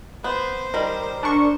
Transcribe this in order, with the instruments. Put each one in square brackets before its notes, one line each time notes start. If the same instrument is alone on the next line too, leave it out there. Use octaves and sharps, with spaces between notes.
[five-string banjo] B3 [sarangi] C5
[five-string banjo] D#3 G3 [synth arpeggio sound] A#4
[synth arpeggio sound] D4 A#4 C#6